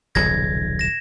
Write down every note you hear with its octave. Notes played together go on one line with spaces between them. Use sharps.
D#1 B1 C#3 G#6 A#6
A#6 E7